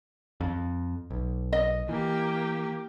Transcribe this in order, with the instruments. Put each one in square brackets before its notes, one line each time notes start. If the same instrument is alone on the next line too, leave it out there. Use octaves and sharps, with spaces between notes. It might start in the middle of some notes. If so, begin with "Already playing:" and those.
[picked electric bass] F2
B1
[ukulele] D#5
[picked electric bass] E3 [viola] A#3 G4